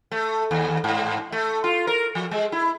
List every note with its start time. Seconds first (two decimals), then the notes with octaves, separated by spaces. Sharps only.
0.12 A3
0.51 D#2
0.84 G#2
1.32 A3
1.64 F4
1.87 A#4
2.15 F3
2.31 G#3
2.52 E4